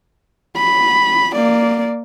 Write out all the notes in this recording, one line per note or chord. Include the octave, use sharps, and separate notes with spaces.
B5
A#3 D5